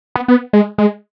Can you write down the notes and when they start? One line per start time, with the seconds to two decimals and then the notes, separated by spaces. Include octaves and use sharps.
0.15 B3
0.28 B3
0.53 G#3
0.78 G#3